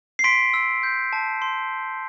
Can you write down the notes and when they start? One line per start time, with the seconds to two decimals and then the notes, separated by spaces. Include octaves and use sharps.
0.19 C7
0.24 C6 B6 D7
0.54 E6
0.83 G6
1.13 A5
1.42 C6